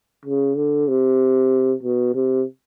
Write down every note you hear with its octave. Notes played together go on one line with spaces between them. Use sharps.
C#3
D3
C3
B2
C3